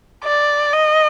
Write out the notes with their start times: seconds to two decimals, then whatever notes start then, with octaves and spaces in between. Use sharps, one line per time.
0.24 D5
0.73 D#5